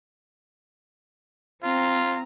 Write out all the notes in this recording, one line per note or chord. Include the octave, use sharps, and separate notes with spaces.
C4 F4 A#5